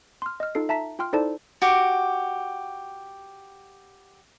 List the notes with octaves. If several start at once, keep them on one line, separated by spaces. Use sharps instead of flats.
C6 F6
D#5 F6
D#4 F4 A4 C7
E5 A5 A#5 B6
F4 G5 C6 F6
D#4 E4 A4 C5 D5 A5
F#4 G4 D6